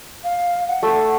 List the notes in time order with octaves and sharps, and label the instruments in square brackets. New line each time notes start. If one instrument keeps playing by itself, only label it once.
[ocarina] F5
F#5
[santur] A3